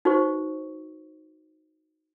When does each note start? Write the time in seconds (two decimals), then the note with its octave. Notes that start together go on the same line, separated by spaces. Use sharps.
0.05 D#4 F#4 B4 C5 C#6